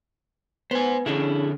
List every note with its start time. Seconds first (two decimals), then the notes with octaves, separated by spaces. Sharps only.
0.71 B3 C5 G#5
1.06 D3 C#4 D4 E4 G#4